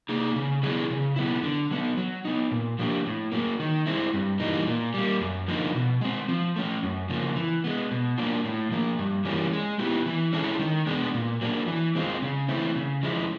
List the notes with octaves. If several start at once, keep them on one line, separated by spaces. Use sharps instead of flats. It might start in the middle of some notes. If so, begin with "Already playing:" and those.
A#3 D#4 G#4
C#3
F#3 B3 E4 G#4
C#3
F#3 B3 E4
D3
F#3 B3
F#3
B3 D#4
A#2
F3 A#3 D4 G4
A2
F#3 A#3
D#3
G#3 C4 E4
G2
E3 G3 A#3 D#4
A#2
G3 A#3
F#2
D3 F3 A#3 D#4
B2
G#3 C4
F3
A3 C#4
F#2
C#3 F3 A#3
E3
G#3 B3
B2
F#3 A#3 D4 F4
A2
F3 A#3
G2
E3 G3 A#3 C#4
G#3
B3 E4 G4
E3
G#3 C#4 E4 A4
D#3
G#3 B3 D4
A#2
F#3 A#3 D4
E3
G#3 C4 F4
C#3
E3 A3 C4 E4
C#3
F3 G#3 C#4 E4